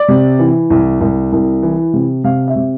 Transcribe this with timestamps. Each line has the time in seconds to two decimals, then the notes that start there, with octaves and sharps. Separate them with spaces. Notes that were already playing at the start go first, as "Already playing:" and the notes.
Already playing: D5
0.08 C3
0.39 E3
0.70 C2
1.01 C2
1.32 C2
1.63 E3
1.94 C3
2.24 C3 F5
2.48 E5
2.56 C3